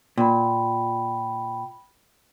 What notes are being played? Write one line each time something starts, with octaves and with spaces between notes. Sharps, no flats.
A#2 G5 B5